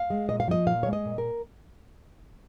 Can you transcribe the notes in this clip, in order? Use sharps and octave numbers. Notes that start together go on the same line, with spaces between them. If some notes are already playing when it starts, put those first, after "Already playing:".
Already playing: F5
G#3
A#2 D#5
F5
F3 D#5
A#2 F5
G#3 C#5
D#5
A#2
A#4